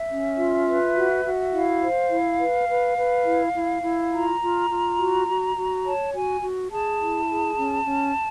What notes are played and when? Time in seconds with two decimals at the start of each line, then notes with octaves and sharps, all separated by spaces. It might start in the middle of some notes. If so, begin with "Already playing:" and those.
Already playing: E5
0.09 C#4
0.37 F4
0.67 B4
0.96 F#4
1.24 F#4
1.52 E4 F5
1.82 C5
2.10 E4
2.39 B4
2.69 B4
2.97 B4
3.25 E4
3.54 E4
3.83 E4
4.12 F4 A#5
4.41 F4
4.70 F4
4.99 F#4
5.27 F#4
5.57 F#4
5.85 C#5 A5
6.14 F#4 G#5
6.42 F#4
6.71 G#4 A5
7.01 E4
7.29 G#4
7.58 C#4
7.87 C#4